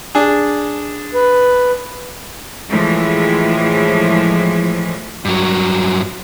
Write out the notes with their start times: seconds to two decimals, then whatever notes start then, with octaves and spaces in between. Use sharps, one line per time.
0.15 D4 G#4
1.14 B4
2.69 A2 E3 F3 G#3
5.25 G2 F#3